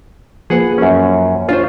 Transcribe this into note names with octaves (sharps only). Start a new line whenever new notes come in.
F3 A#3 G#4 B4 F#5
F#2 C#4
D4 F4 C5 C#5